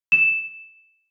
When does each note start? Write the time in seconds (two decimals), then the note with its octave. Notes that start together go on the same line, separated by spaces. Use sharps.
0.12 E7